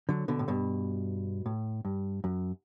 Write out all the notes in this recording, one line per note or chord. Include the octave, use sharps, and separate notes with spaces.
D3 F#3
B2 D3
A2
G2 B2
A2
G2
F#2